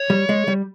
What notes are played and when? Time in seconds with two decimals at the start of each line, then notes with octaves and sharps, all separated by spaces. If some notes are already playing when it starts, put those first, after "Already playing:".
Already playing: C#5
0.10 G3
0.29 G#3
0.48 G3